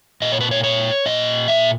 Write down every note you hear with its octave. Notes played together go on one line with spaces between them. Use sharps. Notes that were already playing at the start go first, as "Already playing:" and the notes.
A#2 D#5
C#5
B4
C#5
C#5
A#2 D#5
E5